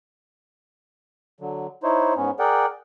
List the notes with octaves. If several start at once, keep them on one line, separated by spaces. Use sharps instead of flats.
D3 F#3
D#4 E4 C5 C#5
G#2 B3 C#4
G#4 A#4 D5 F#5 G5